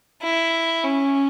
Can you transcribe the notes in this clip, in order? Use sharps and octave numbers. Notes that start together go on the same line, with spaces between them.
E4
C#4